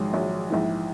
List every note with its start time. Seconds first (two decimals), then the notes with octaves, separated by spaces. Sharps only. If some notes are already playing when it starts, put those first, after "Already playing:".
Already playing: A#1 G#2 D#3 F#3 G#3
0.13 A#1 G#2 D#3 F#3
0.50 A#1 G#2 E3